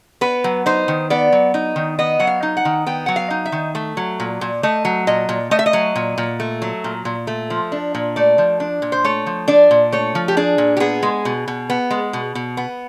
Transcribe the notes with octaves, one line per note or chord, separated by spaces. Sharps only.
B3 B4
F#3
D#4 C5
D#3
B3 D5
F#3
D#4
D#3
B3 D#5
F#3 F#5
F5
D#4
F#5
D#3
B3 G5
F#3 F#5
F5
D#4
E5
D#3
A3
F#3
A#2
A#2
A3 D#5
F#3
A#2 D#5
A#2
A3 D#5
E5
D#5
F#3
A#2
A#2
A3
F#3
A#2
A#2
A3
F3
D4
A#2
A3 D5
F3
D4
A#2
C5
A3 C#5
F3
D4 D5
A#2
A3 C#5
F3
G4
D4 G#4
A#2
G4
B3 G#4
G#3
B2
B2
B3
G#3
B2
B2
B3